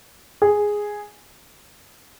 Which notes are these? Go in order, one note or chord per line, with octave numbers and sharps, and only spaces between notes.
G#4